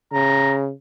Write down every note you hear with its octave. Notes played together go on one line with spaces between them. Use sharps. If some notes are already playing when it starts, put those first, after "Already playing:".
C#3 A#5